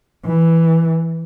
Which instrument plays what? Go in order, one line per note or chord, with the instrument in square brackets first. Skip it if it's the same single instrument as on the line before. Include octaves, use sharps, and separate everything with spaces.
[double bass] E3